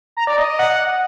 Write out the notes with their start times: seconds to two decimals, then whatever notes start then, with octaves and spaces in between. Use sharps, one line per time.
0.17 A#5
0.27 D5
0.38 D#5
0.49 D#5
0.59 F#5